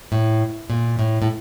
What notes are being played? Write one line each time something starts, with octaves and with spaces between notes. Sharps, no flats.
A2
A#2
A2
A2